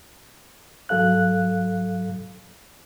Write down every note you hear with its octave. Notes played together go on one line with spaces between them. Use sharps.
G#2 F#3 A4 F5 F#6